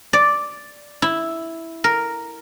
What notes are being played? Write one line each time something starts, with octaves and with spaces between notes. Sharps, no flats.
D5
E4
A#4